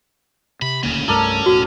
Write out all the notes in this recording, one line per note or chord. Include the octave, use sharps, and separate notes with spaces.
C3 B5
D#1 D2 C#3 A#3
C2 G2 A3 C#4 A4 A#4 D5
E1 A2 F#4